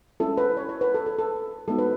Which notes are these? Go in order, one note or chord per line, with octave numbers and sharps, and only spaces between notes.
G#3 C#4 E4 A4
B4
C#5
C#5
B4
A4
A4
A4
G#3 B3 D#4 F#4 A4
B4